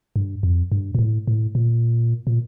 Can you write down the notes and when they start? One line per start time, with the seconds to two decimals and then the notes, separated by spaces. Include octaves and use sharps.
0.16 G2
0.43 F2
0.72 G2
0.95 A#2
0.99 A2
1.27 A2
1.55 A#2
2.27 A#2